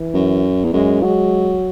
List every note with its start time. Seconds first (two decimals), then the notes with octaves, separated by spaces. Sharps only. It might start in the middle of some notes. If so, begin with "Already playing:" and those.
Already playing: E3
0.14 F#2
0.64 E2
0.73 F#2 G#3
1.03 F#3 G#3